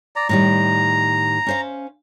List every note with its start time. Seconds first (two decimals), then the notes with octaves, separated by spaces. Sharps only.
0.16 D5 A#5
0.29 A2 D#3 G3 A#5
1.47 C#4 C5 F5